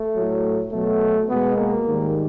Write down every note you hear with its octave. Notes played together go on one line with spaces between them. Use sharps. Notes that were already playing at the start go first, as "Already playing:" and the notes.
Already playing: A3
A2 F#3
B2 F#3 A3
B2 G#3 B3
A#3
G#2 D#3 G3